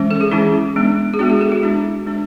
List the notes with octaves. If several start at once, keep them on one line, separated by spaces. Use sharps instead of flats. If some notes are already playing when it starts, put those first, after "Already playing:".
Already playing: E3 G#3 C#4
A4
G#4
E3 G#3 C#4 E4
G#3 B3 D4
G#4
G#3 B3 D4 F#4
G#4
A4
F#4
G#3 D4 E4
G#3 D4